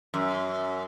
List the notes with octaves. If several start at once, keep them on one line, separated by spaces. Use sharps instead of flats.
F#2